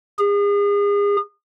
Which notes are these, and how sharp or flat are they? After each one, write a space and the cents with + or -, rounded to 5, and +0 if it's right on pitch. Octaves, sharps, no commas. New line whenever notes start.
G#4 -35